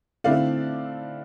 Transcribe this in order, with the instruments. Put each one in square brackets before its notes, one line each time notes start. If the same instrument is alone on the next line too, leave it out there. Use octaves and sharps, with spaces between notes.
[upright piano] D3 A3 C4 E4 D5 F5